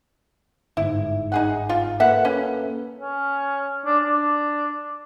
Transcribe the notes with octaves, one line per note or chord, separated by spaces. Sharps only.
G1 G#2 E4
D#4 G#4 F#5
F4
A#3 A4 B4 E5 F#5
C#4
C#4
D4
D4